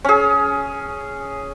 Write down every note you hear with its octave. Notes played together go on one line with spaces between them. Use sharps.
C#4 G#4